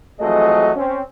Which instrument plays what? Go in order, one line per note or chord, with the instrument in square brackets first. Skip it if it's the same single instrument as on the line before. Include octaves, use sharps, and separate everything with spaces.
[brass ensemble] F2 E3 F#3 G#3 A3 D#5
C4 C#4